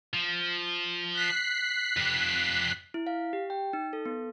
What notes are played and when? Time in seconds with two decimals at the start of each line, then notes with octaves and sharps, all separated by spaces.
0.14 F3
1.14 F#6 B6 C7
1.97 F2 G4
2.94 E4
3.07 F5
3.33 G4
3.50 G5
3.73 D#4
3.93 A4
4.05 B3